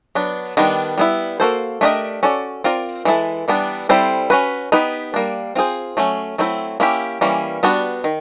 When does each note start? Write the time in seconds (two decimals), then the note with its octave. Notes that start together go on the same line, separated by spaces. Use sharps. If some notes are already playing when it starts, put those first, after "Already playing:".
0.15 F#3 B3 D4
0.57 D#3 G3 B3 D4
0.98 G3 B3 E4
1.40 A#3 D4 F#4 A4 C5
1.81 A3 D4 G4 A#4 D#5
2.23 C#4 F#4 A4 D5
2.64 C4 F4 A#4 D5
3.05 E3 G#3 C4 E4 A4
3.48 E3 G3 B3 D4
3.89 G3 C4 E4 A4 C5
4.30 C#4 F#4 B4
4.72 B3 D#4 G4 B4
5.14 G3 A#3 D4
5.55 C4 F4 G#4 C5
5.97 F#3 A3 C#4
6.38 F#3 A3 C4 E4
6.80 A#3 C#4 E4 G4
7.21 E3 G3 A#3 C#4
7.63 G3 B3 D4 F#4
8.04 D#3